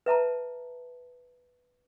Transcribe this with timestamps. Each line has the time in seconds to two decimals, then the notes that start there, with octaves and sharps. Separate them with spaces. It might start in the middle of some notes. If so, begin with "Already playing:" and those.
0.06 B4 E5 A5 A#5